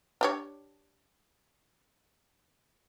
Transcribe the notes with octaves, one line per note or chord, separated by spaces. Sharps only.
D4 G4 C#5